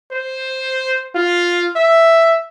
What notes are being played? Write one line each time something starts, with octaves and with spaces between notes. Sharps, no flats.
C5
F4
E5